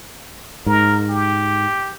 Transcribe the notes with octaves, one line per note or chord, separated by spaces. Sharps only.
G#2 A#4
G4